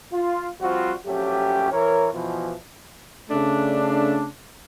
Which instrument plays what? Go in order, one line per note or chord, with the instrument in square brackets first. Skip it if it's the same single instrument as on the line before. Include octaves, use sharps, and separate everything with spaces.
[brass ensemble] F4
F3 G3 C4 F4 F#4
A#1 F#3 A3 C#4 G4
E3 A#4 C#5
B2 E3 F3
[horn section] C#3 A3 D4